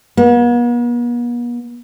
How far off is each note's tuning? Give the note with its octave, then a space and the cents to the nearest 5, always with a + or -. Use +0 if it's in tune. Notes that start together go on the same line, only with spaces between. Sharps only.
B3 -45